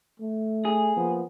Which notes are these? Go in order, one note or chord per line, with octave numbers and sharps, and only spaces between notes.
A3
G#4
F3 A#3 B3